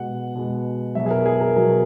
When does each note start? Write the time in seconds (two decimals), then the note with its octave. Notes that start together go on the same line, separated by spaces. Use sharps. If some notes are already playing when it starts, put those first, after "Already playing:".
Already playing: B2 G#3 F#5
0.35 B2 G#3
0.95 B2 F#3 E5
1.06 G#4
1.11 A#4
1.26 G#4
1.41 A#4
1.56 B2 F#3 A#4